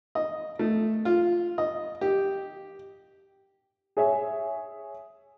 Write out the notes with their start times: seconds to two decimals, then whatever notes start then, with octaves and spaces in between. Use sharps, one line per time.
0.15 D#5
0.59 A3
1.05 F4
1.58 D#5
2.01 G4
3.97 G#4 C#5 E5 G#5